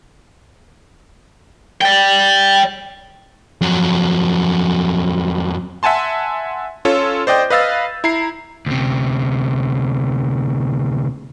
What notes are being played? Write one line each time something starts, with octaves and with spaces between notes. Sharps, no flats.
D5 G5
F2 F#3
E5 F#5 G#5 A5 C6
C#4 F4 A4 C#5
C5 D5 D#5 G5 G6
B4 D#5 F5 E6 A6
E4 A#5 C7
D2 C3